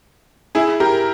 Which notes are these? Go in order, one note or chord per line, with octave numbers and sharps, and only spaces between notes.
E4 G#4
G4 A#4